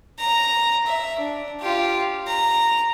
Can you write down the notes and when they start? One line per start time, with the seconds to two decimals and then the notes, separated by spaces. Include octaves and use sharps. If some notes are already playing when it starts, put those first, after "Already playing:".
0.19 A#5
0.86 E5
1.19 D4
1.61 F4 G4
2.27 A#5